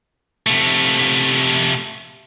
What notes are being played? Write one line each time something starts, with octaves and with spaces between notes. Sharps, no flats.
C3 A3